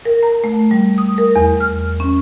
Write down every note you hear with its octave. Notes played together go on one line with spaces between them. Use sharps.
A#4
A#5
A3
G3
D#6
A#4
E2
F6
C#4